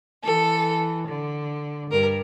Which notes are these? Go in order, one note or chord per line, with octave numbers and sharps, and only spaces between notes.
E3 A4
D3
G2 A#4